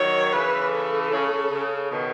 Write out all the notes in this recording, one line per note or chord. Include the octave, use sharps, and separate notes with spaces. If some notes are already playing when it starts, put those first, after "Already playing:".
Already playing: D#3 F#3 C#5
C#3 E3 B4
A4
C#3
C#3
C#3
B2 D#3